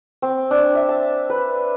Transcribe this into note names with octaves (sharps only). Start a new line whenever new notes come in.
C4
D4
E5
A5
B4